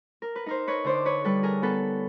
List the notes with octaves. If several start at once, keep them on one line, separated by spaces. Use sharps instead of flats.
A#4
B4
D#4 A#4 C5
B4 C#5
D3 C5 D5
B4 C#5
G3 A4 B4
G#4 A#4
B3 A4 B4